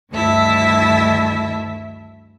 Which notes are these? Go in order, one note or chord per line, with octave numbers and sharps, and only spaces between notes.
D2 G2 D#3 E4 E5 A5